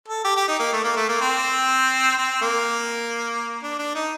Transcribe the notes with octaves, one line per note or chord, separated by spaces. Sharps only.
A4
G4
G4
D#4
A#3
A3
A#3
A3
A#3
C4
C4
A#3
D4
D4
D#4